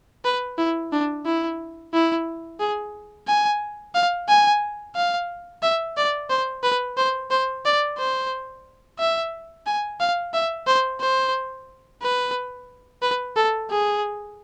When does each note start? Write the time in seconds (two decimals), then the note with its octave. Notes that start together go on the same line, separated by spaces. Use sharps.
0.25 B4
0.58 E4
0.92 D4
1.26 E4
1.93 E4
2.60 G#4
3.27 G#5
3.95 F5
4.29 G#5
4.95 F5
5.63 E5
5.97 D5
6.30 C5
6.63 B4
6.97 C5
7.31 C5
7.65 D5
7.98 C5
8.99 E5
9.66 G#5
10.00 F5
10.34 E5
10.67 C5
11.00 C5
12.02 B4
13.02 B4
13.36 A4
13.70 G#4